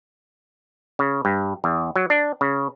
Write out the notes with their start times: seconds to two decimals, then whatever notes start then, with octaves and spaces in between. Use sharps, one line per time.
0.99 C#3
1.25 G2
1.64 E2
1.96 F#3
2.10 D4
2.41 C#3